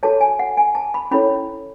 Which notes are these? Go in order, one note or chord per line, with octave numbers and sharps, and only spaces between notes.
F#4 A4 C#5 A5
G#5
F#5
G#5
A5
B5
C#4 E4 A4 C#5 B5